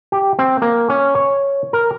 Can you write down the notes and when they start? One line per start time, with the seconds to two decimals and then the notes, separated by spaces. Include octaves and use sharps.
0.12 G4
0.39 C4
0.62 A#3
0.90 C#4
1.15 C#5
1.73 A#4